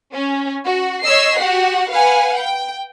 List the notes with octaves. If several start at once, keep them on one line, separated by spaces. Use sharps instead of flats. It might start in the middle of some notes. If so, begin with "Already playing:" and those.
C#4
F#4
C#5 D#5 E6 B6 C7
F#4 G4 F#5
B4 F5 F#5 G#5
G5